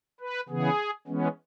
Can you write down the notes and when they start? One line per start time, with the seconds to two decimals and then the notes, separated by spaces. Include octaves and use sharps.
0.20 B4
0.49 C#3 E3 B3 G#4
1.08 E3 G#3 B3 C#4